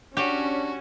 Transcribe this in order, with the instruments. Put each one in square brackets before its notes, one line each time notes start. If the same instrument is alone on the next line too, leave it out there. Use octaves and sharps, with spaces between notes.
[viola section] C#4 [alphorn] D4 [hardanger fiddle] F#4 [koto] G4